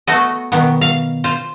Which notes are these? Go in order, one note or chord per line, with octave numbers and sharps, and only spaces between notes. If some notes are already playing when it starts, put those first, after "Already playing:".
A3 B3 F#4 D#5
B2 D#3 B3
F5
F4 C5